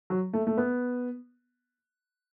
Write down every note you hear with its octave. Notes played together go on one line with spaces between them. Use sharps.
F#3
A3
A3
B3